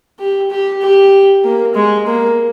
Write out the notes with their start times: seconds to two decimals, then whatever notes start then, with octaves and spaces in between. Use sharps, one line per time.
0.19 G4
0.50 G4
0.81 G4
1.44 A#3
1.75 G#3
2.07 A#3